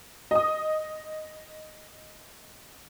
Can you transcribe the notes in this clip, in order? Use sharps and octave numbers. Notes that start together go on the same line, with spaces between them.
D#5 D#6